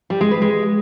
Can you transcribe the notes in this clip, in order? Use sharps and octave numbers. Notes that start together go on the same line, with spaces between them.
G3
G#3
B4
G#3